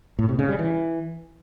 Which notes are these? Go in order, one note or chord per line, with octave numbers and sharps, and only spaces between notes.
A2
C3
C#3
G3
E3